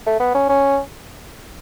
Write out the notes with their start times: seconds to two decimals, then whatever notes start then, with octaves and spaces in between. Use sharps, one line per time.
0.07 A3
0.20 B3
0.35 C#4
0.49 C#4